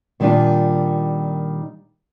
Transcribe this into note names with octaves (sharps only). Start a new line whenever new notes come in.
A#2 D#3 G3 A#3 D4 F4